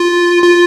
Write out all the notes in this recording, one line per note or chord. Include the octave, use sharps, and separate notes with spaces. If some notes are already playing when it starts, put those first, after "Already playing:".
Already playing: F4
F4